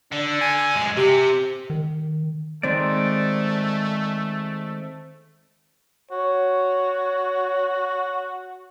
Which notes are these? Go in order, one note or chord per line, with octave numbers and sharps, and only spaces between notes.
D3 D4
G#5
F#2 G#3
C3 G4
D#3
D#3 G#3 A3 C4 D5
F#4 C#5